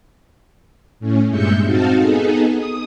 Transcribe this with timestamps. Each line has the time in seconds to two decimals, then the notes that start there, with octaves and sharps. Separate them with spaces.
1.00 A2 C#4
1.29 G2 A#2 G#3 E5 G6 C#7
1.63 C4 D#4 F#4 F5 A5
1.97 B3 D#4 G#4 A4
2.49 D#6